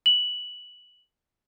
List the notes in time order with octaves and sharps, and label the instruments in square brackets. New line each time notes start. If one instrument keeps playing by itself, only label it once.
[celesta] F#7